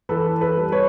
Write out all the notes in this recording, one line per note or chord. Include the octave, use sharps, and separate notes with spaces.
E3 A4 B4
A4 B4
G3
B4 C#5